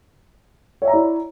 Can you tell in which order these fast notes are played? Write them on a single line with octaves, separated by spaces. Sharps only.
C#5 E5 A#5 D5 E4